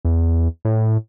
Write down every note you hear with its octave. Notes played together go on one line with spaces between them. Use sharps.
E2
A2